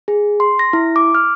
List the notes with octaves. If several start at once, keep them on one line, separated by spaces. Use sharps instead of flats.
G#4
C6
A#6
E4
D6
F6